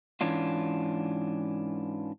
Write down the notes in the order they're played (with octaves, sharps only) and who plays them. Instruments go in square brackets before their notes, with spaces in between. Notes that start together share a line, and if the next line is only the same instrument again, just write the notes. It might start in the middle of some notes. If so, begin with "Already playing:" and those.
[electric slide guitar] G#2 E3 C#4 D4 F4